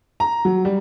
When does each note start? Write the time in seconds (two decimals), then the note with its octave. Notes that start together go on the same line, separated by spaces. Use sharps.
0.20 A#5
0.45 F#3
0.65 G3